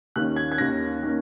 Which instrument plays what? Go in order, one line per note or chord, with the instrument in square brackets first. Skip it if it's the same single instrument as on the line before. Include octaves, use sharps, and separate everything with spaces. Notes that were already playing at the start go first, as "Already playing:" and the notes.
[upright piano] D#2 D#3 A#3 C#4 F#6
G#6
G#6
D#2 D#3 A#3 C#4 A#6
D#3 A#3 C#4